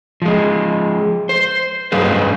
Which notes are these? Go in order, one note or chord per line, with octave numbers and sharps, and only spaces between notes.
F3 G#3
C5
G2 F#3 G#4 B4 C5